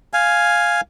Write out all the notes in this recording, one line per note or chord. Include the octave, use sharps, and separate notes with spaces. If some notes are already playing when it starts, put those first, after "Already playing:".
F5 G#5